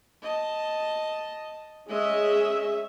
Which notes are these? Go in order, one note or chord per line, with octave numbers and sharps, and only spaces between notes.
D#5 A5
G#3 C#4 G#4 D#5 E5